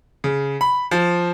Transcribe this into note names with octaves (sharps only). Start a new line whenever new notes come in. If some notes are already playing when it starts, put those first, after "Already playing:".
C#3
B5
F3